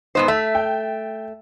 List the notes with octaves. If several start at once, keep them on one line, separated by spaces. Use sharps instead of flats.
G#2 B3 D#4 C5
A3 E5
G5